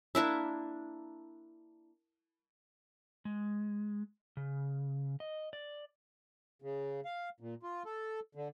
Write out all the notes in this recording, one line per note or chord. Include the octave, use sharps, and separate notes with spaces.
A#3 D4 E4 E5
G#3
C#3
D#5
D5
C#3
F5
A#2
F4
A4
D3